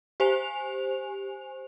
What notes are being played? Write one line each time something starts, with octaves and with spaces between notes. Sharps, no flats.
G4 C5 G#5 F7